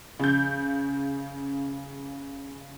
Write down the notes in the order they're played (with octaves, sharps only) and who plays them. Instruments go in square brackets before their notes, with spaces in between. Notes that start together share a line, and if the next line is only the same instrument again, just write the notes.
[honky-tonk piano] C#3 G6